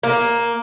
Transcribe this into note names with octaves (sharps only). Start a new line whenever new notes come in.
A#3